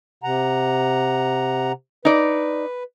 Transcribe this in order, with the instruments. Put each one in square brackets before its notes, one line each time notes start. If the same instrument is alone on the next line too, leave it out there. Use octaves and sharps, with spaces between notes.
[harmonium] C3 F#5 A#5
[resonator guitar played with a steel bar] D#4 D5 [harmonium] B4